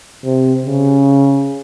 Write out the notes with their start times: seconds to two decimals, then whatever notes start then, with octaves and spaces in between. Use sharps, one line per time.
0.24 C3
0.65 C#3